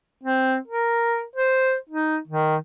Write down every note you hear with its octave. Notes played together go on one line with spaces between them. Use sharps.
C4
A#4
C5
D#4
D#3